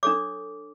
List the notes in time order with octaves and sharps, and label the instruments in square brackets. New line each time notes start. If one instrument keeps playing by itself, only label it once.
[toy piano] D4 A4 C#5 D6